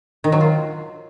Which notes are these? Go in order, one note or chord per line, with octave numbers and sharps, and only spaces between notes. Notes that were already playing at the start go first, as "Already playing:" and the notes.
D#3
F#3
F4